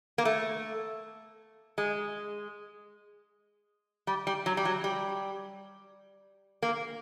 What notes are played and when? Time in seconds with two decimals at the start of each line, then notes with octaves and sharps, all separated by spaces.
0.18 A#3
0.25 A3
1.78 G#3
4.07 G3
4.27 G3
4.46 F#3
4.57 G3
4.65 F#3
4.84 G3
6.63 A#3